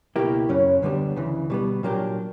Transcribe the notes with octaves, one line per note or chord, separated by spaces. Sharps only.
C#2 B2 A#3 E4 G4
F#2 C#3 F#3 C#4
D2 D3 G3 B3 D4
D2 C#3 E3
B2 G3 B3
A#2 F#3 A#3 D4 G4